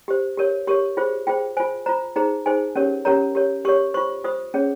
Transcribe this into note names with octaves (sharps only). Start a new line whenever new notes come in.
G4 C5
G4 A#4 C#5
G4 A#4 C#5 C#6
F4 G#4 C5
F4 G#4 C5 G5
F4 C5 G#5
F4 C5 A#5
D#4 G#4 C5 A#5
D#4 G#4 C5 G#5
C#4 G4 A#4 C#5
C#4 G4 A#4 C#5 A#5
G4 A#4 C#5
G4 A#4 C#5 C#6
F4 C5 C#6
F4 C5 D#6
C#4 G#4 C#5